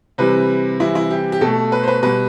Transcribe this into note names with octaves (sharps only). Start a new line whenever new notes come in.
C3 E3 G3 B4
C3 E3 G3 E4
E4
G4
G4
B2 A3 A4
B4
C5
B4
B2 G3 B4